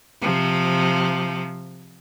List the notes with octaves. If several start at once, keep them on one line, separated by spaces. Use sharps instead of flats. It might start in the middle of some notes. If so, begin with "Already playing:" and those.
C3 F3